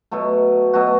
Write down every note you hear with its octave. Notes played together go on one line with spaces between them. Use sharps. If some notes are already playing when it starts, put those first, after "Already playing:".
B2 F#3 A3
B2 F#3 A3 F#4